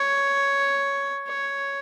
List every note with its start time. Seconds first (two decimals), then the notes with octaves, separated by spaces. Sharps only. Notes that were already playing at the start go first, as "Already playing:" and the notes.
Already playing: C#5
1.27 C#5